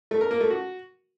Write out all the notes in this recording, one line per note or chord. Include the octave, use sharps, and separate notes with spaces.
A3
A#4
A#3
A3
F#4